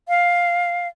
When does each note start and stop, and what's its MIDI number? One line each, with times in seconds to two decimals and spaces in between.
0.08 0.88 77